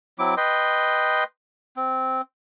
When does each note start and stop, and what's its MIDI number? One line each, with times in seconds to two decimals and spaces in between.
0.19 0.35 54
0.19 0.35 60
0.19 0.35 64
0.19 0.35 86
0.37 1.24 71
0.37 1.24 75
0.37 1.24 79
0.37 1.24 84
1.77 2.21 60